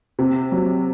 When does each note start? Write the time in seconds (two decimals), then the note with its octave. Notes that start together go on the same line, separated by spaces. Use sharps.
0.19 C3
0.52 F#3